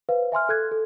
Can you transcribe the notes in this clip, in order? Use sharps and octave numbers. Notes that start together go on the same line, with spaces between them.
B4 C5 F5
E5 G#5 C6 F6
A4 F#6 G#6
A4